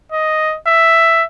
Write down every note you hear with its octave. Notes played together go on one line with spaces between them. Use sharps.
D#5
E5